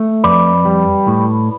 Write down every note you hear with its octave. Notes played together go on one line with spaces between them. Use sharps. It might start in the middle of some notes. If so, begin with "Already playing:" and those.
Already playing: A3
F2 B4 D5
G3
A2